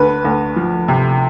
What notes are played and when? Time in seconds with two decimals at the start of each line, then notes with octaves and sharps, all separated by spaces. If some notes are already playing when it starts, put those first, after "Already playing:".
Already playing: D2 B4
0.25 D2
0.56 F3
0.88 C3